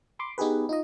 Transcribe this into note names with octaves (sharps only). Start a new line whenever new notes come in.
B5 C6 D6
B3 D#4 G4 G#4 B4
D#4 F4 D#5